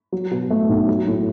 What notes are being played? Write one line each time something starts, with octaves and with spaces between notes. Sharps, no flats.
F#3
B2
A3
B1
F#3
A2